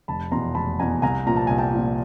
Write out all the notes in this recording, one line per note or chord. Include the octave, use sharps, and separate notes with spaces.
F1 A5 B5
E2 B2 A#5 C6
F1 A5 B5
E2 B2 G#5 A#5
C2 G#5 A#5
A#2 F3 A#5
A5
C2 G#5
G5 A5
A#2 F3